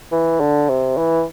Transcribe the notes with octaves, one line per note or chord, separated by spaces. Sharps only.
E3
D3
C3
E3